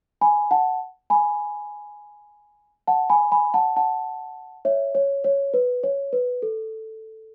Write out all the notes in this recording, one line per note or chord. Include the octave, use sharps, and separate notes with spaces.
G#5 B5
F#5 A5
G#5 B5
F#5 A5
G#5 B5
G#5 B5
F#5 A5
F#5 A5
C#5 E5
C#5
C#5
B4
C#5
B4
A4